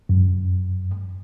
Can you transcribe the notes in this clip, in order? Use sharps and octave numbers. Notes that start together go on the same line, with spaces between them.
F#2